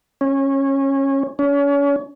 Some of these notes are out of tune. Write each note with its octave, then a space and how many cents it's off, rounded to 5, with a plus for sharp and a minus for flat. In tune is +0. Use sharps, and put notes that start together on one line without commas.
C#4 -20
C#4 +35